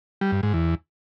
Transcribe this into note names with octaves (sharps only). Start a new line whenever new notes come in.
G3
G2
G#2
E2